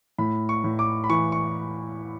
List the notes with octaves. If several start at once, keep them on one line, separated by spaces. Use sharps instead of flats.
A2 B5
C#6
A2
D6
B5
E3 C#6
C#6